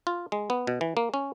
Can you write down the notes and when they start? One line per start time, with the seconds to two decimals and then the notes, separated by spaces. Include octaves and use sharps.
0.07 F4
0.32 G#3
0.50 B3
0.67 B2
0.81 E3
0.97 A#3
1.14 C#4